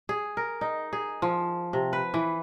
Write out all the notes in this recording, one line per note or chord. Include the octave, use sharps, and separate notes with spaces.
G#4
A#4
D#4
G#4
F3
C3
B4
E3